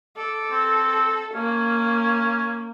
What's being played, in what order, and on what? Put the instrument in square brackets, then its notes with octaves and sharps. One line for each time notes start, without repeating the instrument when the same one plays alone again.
[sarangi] A4 [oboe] D6
[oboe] C4
[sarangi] A#3 [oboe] C#4